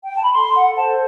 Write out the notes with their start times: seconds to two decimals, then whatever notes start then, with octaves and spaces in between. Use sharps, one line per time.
0.04 G5
0.14 A5
0.23 B5
0.34 A4 C6
0.55 F#5
0.77 C5 A5